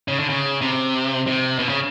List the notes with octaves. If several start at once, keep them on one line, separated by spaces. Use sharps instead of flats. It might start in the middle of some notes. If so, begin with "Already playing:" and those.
C#3
D3
C#3
C3
C3
B2
C#3